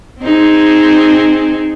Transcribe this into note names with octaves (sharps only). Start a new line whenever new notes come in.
C4 D#4 G#4